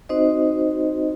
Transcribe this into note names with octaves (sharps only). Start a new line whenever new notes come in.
C4 D#4 F#4 C5 D#5